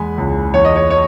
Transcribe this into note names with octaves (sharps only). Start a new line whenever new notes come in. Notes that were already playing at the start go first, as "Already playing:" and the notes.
Already playing: E2 G#3 G#5 B5
C#2
E2 C#5
D#5
C#5
C#5